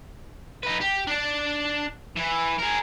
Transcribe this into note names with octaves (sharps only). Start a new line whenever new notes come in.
D#4 B4
G4
D4 D5
E3
G#4 A#4